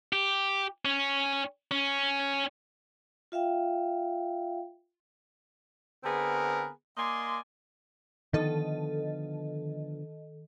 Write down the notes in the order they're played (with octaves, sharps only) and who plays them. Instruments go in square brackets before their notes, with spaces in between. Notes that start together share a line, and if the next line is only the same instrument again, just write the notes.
[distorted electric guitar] G4
C#4
C#4
[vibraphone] F4 E5 F5 G5
[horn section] D3 B3 C4 G#4 A#4 B4
A#3 D5 D#5 G#5 C6
[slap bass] D3 F3 B3 [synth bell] D#3 A4 D#5